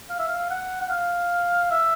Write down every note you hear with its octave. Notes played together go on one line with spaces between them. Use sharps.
F5
E5
F5
F#5
F#5
F5
E5